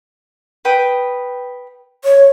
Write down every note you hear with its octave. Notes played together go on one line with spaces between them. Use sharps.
B4 G5 D#6
C#5